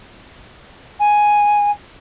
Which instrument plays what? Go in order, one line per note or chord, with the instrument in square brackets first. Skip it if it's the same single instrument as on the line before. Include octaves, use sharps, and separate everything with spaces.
[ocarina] G#5